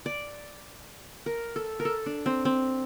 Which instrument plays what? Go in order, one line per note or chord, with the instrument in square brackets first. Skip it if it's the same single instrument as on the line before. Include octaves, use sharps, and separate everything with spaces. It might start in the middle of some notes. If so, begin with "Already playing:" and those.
[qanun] D5
A#4
A4
A#4
A4
D4
C4
C4